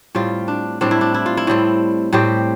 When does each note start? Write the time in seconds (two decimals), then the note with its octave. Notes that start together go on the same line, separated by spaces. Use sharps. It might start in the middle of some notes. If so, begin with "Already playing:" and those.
0.15 A2 G3 C4 F4
0.48 D4
0.81 A2 G3 C4 D4
0.91 E4
1.01 D4
1.14 E4
1.26 F4
1.37 E4
1.47 A2 G3 C4
2.13 A2 G3 C4 G4